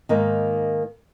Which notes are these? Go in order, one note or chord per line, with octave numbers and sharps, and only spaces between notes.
G#2 D#3 A#3 D#4